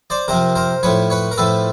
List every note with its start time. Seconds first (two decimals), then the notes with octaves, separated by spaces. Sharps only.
0.10 C5 D5
0.28 C3 F3 A#4 C5
0.55 A#4 C5
0.83 A2 F3 B4 C#5
1.10 B4 C#5
1.31 A#4
1.38 A2 F3 A4 B4